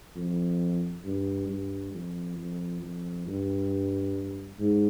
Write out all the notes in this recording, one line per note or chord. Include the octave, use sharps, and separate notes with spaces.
F2
G2
G2
F2
F2
F2
G2
G#2